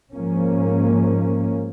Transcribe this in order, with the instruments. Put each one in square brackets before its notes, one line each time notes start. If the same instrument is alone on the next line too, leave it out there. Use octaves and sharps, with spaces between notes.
[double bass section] G#2 F3 A#3 C#4